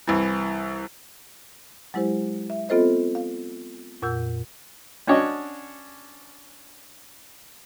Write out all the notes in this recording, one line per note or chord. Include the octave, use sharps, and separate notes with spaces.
C2 E3
F#3 G#3 E4 G4 C5
E5
B3 C4 F4 A4 C5 D#5
F5
F2 A#2 F#5 E6 G6
C#4 D4 F#4 C#5 D#5